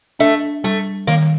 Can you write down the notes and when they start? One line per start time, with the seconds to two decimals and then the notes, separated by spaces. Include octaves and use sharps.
0.19 A3 D4
0.64 G3 A3
1.07 D#3 A#3